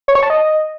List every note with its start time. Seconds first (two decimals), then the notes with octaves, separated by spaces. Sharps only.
0.08 C#5
0.15 C#6
0.23 A5
0.30 D#5